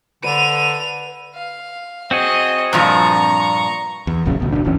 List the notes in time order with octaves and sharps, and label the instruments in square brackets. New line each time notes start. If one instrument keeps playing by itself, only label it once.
[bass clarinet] D3 [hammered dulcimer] B4 D5 [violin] D#7 F7
[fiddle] F5
[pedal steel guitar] C4 F#4 G#4 [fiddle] D#5
[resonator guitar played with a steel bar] G2 A#2 F3 [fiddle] A#5 C#6
[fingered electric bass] E2
D#1 A#1 F#2 C#3
D2 B2
E1 F#2 B2 D4
D1 G1 E3 C#4